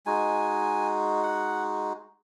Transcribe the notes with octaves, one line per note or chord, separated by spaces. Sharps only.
G#3 D#4 F#4 G#5
F#5